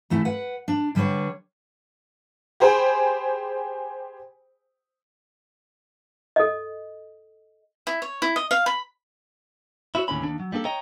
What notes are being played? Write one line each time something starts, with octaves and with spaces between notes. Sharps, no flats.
E2 A3 E4
B4 F#5
D4
D3 G3 D4 B4 C#5
G4 G#4 C5 G5 G#5 B5
A4 D#5
E4
C#5
E4
D#5
F5
B5
E4 F#4 C#5
D#2 A2 D3 C#4 B5
D#2 D4
F#3
G3 A#3 D4 A4
C#5 D#5 G5 A#5